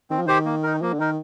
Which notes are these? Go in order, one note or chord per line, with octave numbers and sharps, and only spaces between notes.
D#3 C4
F3
D#3 G4 C5
A#3
D#4 A#4
F3 A#3
D3
D#3 D#4 A#4